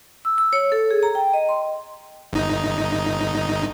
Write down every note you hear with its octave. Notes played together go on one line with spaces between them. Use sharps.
E6
E6
C#5
A4
G#4
A#5
G5
D#5
C6
G1 D#4